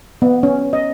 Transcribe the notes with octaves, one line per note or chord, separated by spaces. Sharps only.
B3
C#4
D#5